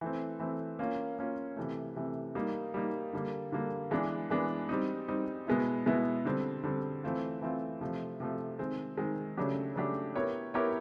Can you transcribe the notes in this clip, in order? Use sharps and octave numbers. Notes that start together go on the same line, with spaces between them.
E3 A3 C4
E3 A3 C4
A#3 C#4 F4
A#3 C#4 F4
C3 E3 A3
C3 E3 A3
G3 A#3 D#4
G3 A#3 D#4
D3 G3 A#3
D3 G3 A#3
E3 G#3 B3 D4
E3 G#3 B3 D4
G3 C4 D#4
G3 C4 D#4
B2 G#3 B3 E4
B2 G#3 B3 E4
D3 G3 C4
D3 G3 C4
E3 A3 C4 F4
E3 A3 C4 F4
C3 F3 A3
C3 F3 A3
D#3 G#3 C4
D#3 G#3 C4
C#3 F#3 A3 D4 G4
C#3 F#3 A3 D4 G4
B3 E4 G4 A#4 C#5
B3 E4 G4 A#4 C#5